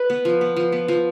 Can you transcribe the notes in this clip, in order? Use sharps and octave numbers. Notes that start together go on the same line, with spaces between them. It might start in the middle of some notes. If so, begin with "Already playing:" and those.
Already playing: B4
B3
F3
B3
F3
B3
F3